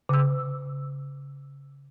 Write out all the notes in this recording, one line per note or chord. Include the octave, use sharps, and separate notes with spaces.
C#3 E6